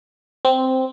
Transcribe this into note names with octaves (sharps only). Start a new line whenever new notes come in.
C4